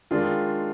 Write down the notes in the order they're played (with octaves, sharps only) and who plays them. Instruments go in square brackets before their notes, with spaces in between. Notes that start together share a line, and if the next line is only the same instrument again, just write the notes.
[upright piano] D#3 G#3 D4 F4